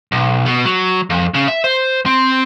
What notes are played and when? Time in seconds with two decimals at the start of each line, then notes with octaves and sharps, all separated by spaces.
0.12 B1
0.46 B2
0.65 F#3
1.10 F2
1.34 C#3
1.48 E5
1.64 C5
2.06 C4